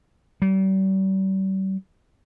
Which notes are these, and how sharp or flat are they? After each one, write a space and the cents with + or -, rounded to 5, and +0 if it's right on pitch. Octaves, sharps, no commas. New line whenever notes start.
G3 -40